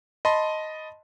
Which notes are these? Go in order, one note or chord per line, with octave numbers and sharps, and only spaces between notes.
D#5 A5 B5 C6